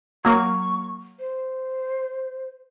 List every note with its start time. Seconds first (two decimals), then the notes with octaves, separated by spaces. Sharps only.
0.25 F#3 A#3 C#6
1.19 C5